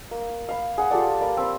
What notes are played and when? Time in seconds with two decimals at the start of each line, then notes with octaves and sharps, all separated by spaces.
0.11 A#3
0.49 F5 B5
0.78 G#4 F#5
0.91 F4 G4 A4 D5
1.21 A#3 D5 B5
1.37 C4 B5